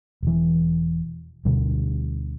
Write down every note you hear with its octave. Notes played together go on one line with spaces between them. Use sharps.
E1 E3
D2 B2 D3 G3